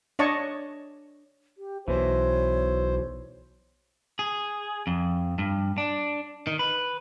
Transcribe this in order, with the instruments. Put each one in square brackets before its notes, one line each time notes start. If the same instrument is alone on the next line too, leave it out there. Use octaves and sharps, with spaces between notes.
[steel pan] D4 C#5 D#5 A5 C#6
[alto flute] G4
[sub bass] B1 [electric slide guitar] B2 E3 [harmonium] C5 [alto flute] C#5
[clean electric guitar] G#4
F2
G2
D4
D#3
B4